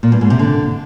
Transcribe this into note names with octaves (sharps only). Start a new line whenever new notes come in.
A#2
G2
G#2
C3
D3